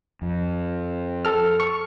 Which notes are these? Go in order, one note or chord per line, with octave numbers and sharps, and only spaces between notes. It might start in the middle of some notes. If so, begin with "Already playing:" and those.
F2
A4 F6
C#6